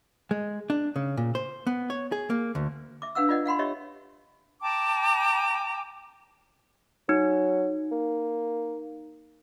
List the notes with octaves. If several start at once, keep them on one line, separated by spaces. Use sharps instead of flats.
G#3
D4
C#3
A#2
C5
B3
C#5
G#4
A#3
D2
E5 D6
D4 B4 F5 F#5 E6
F4 B4 D5 D#5 F#5
F5 F#5 B5 C6
G4 C#5 D#5 E5
G5 A5 A#5 D6
F#3 D#4
A#3